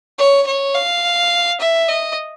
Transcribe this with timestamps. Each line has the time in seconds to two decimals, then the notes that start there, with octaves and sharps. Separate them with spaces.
0.18 C#5
0.46 C#5
0.75 F5
1.60 E5
1.89 D#5